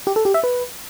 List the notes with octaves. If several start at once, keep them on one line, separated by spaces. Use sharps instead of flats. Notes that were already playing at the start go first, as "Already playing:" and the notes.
G4
A4
G4
E5
B4